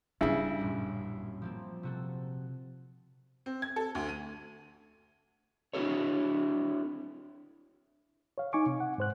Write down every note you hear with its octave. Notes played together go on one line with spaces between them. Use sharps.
G2 C#3 G3 C#4 E4
A1 F#2 A#2
F3 A#3 C4
C3 F#4 A4
C4
G#6
A4
D2
D#7
C4 D4 E4 F#4 A4 C#5
C#5 F5
D#4 G#5 C#6 D6
C3
F#5
G#2 C5 F#6